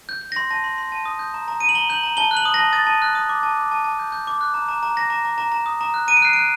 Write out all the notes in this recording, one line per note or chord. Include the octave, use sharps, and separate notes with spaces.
G6
G6
C6 A#6
A5 A#6
C6
C6
A5
D#6
G6
A#5
A#5
A#5 D#7
F#7
A#5 G7
G6 F#7
A#5
A5 G7
F#6
F#7
D#6
A#6
A5
D#6 A6
A5
F#6
D#6
D6
A5
D6
A5
A5
G6
G6
D6
F#6
A#5
A#5
A#5
A#5 A#6
A#5
A#5
A#5
A#5
D#6
A#5
F#6
A#5 D#7
D7
F#6 C7
F#6 D7